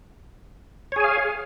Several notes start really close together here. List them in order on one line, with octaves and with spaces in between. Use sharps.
C#5 G#4 G#5 F5